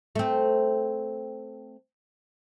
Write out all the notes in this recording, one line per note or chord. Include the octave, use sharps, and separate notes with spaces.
A3 C4